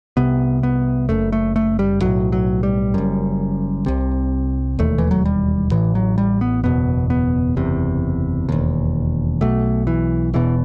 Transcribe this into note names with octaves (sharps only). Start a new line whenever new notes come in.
C2 C3 B3
B3
F#1 F#2 A3
A3
A3
G3
B1 A2 F#3
F#3
G3
F#1 F#2
C2 C3
E1 D#2 A3
E3
F#3
G3
A1 A2 E3
F#3
G3
B3
F#1 E2 B2 B3
B3
F#1 E2 C3
E1 D#2
B1 B2 A3
E3
E1 E2 B2 E3